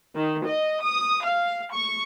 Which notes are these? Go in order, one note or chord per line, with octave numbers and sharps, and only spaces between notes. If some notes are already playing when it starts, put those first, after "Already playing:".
D#3
D#5
D#6
F5
C#6